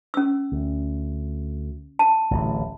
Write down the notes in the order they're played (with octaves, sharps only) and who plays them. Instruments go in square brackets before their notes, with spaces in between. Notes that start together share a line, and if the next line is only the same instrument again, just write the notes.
[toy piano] C#4 E6
[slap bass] D2
[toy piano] A5
[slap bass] D1 A1